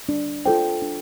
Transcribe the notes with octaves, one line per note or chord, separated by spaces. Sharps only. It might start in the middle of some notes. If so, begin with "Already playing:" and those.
D4
F4 A4 C5 G5
D4